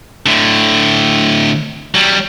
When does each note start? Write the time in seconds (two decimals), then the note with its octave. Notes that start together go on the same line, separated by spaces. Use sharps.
0.26 A2 D3
1.95 F#3 G3